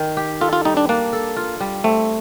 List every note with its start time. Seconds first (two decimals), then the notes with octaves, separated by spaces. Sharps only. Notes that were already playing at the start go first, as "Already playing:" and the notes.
Already playing: D#3
0.17 G4
0.41 F4 A4
0.53 F4
0.65 G3 D#4
0.77 D4
0.89 A#3 D4
1.13 A4
1.36 F4
1.60 G3
1.84 A3 C4